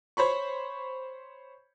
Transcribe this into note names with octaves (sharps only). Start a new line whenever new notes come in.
C5 C#5 B5 C#6